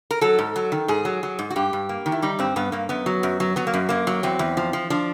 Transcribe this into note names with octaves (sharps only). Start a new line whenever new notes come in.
A#4
F#3 A4
G#2
F#3
D#3
G#2 G#4
F#3
F#3
G#2
F#4
G2 G4
G2
A#3
D#3
E4
G3 D#4
G2 C4
G2 B3
G2 A#3
F#2 B3
F#3
F#2
F#3
F#3 B3
A#3
F#2
F#2 A#3
F#3
E2 C4
E2
F3
F3
F3 D4